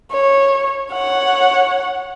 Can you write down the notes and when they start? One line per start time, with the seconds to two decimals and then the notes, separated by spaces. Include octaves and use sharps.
0.12 C#5
0.92 C#5 F#5